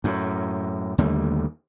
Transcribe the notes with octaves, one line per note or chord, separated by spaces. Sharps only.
F#2 A2
D#2 D3 G3 A3